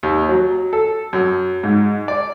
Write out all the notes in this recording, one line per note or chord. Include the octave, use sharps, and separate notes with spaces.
D#2
F#3
A4
F#2
G#2
D5